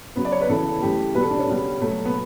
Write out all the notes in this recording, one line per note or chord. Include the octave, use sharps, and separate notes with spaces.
C#3 F#3 B3
D5
C#5
B4
C#3 E3 B3 A4
C#3 E3 A3 G4
B2 G3 B3 B4
A4
D4
C#4
C#3 G3 B3
B2 F#3 A3
B3